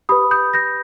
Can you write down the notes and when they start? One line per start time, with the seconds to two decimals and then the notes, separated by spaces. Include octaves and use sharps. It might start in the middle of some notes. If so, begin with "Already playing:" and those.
0.09 G4 B4 B5 D#6
0.31 D#6 G6
0.54 G6 A#6